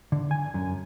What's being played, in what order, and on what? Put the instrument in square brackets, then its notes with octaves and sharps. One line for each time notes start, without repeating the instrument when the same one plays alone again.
[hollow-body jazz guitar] D3
G#5
F#2